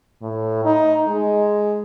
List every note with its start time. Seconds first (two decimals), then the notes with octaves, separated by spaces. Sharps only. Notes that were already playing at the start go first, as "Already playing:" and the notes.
0.22 A2
0.65 D#4
1.08 G#3